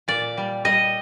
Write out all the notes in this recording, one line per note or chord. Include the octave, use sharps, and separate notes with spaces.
A#2 D5
G3
G3 D#5